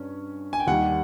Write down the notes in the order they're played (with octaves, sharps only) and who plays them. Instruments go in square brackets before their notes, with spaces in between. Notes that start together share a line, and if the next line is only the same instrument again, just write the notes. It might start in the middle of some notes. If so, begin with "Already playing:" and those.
Already playing: [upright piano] G2 C#4
[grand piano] G#5
G5
[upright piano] D#2 D#3 G3 [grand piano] F#5